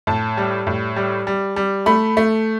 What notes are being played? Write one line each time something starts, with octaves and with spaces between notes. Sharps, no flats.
A2 A5
G3
A2
G3
G3
G3
A3 B5
A3